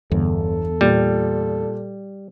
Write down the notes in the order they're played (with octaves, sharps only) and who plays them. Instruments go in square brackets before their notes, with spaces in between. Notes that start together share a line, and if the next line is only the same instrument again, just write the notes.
[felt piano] G1 [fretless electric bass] E2 [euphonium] A4
[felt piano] A#2 [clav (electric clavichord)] G3